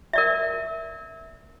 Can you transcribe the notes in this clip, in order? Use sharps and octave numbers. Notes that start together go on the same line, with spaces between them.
A#4 D5 E5